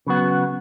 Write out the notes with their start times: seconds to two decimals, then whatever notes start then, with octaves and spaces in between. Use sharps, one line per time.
0.07 C#3 F#3 B3 F#4